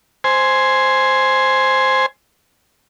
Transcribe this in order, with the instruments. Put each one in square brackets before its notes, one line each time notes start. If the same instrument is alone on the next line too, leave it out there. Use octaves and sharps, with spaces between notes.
[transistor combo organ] C5 G#5